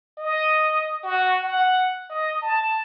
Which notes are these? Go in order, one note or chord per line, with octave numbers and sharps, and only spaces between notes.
D#5
F#4
F#5
D#5
A5